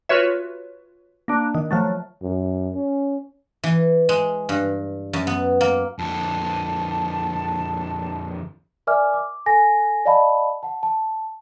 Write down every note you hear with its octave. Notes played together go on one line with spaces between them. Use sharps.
F4 F#4 B4 C#5 E5
A#3 D4
D#3
F3 F#3 A3
F#2
C#4
E3
G#3
G2
F#2
B3
A#3
F2 D3 A5
A#4 D5 E5 G#5 D6 F6
D6
A4 G#5 A#6
D5 D#5 F5 A5 B5
F#5 A5
A5